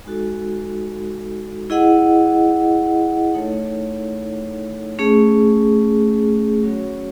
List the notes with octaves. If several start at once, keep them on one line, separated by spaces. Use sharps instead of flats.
G#3 D#4 F#4 A4
E4 G#4 D#5 F#5
A3 D#4 A4 C#5
A3 C#4 G#4
F#3 C#4 F#4 C#5